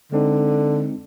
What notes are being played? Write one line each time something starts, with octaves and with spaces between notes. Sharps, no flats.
D3 G#3 C4 D#4